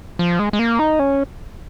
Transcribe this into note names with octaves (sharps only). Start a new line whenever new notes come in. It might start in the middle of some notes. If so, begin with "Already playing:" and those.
F3
G#3
G#3
A#3
D#4
C#4